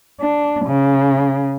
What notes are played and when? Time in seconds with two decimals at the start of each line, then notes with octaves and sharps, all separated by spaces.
0.21 D4
0.66 C#3